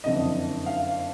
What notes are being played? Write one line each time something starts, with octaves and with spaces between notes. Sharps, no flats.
F#1 F2 D3 D#5
F5